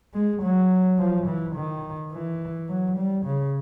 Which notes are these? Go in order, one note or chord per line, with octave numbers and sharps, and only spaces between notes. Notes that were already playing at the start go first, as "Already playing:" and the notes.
G#3
F#3
F3
E3
D#3
E3
F#3
G3
C#3